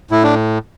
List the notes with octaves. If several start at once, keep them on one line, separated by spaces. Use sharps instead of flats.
A2 E4
D4